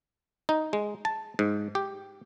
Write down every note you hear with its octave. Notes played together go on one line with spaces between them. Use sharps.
D#4
G#3
A5
G#2
G4